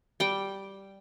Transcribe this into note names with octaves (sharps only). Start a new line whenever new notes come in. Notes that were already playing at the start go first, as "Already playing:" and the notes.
G3 G5